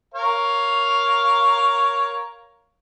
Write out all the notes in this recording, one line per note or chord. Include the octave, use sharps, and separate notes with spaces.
A#4 C#5 F5